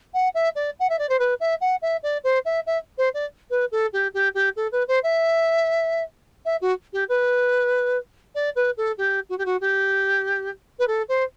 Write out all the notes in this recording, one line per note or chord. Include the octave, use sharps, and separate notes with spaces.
F#5
E5
D5
F#5
E5
D5
C5
B4
E5
F#5
E5
D5
C5
E5
E5
C5
D5
B4
A4
G4
G4
G4
A4
B4
C5
E5
E5
F#4
G4
B4
D5
B4
A4
G4
F#4
G4
F#4
G4
B4
A4
C5